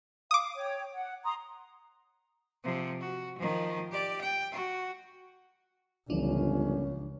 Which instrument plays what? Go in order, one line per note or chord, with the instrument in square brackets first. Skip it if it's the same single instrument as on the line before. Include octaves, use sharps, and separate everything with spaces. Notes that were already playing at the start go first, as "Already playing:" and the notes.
[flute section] F5 [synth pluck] D6 D#6
[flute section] C#5 G5
F#5
A#5 C6 D#6
[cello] C3 F3
F#4
D#3 F3
G4 D5
G5
F#4
[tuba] G1 [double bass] C#2 [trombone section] A#2 C#4 [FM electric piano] E3 F3 D4